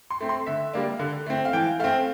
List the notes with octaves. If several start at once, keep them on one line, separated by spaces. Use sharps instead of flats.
C6
A3 C4
C6
D3 E5
G3 A#3 D4
D3
A3 C4
F5
E3 G5
A3 C4 F5